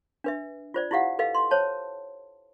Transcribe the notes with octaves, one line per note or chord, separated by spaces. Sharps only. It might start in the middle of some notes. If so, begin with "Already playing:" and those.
D4 B4 E5
F4 C5 D5
E4 F4 G4 F5 F#5
A4 B4 D#5 F5
C6
C5 C#5 A5